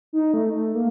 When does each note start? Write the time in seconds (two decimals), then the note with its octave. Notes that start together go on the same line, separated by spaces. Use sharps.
0.13 D#4
0.34 A3
0.53 A3
0.75 A#3